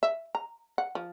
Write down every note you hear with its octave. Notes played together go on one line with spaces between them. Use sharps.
E5
A#5
F#5
F3